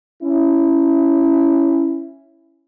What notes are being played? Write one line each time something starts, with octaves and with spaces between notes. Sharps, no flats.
C#4 E4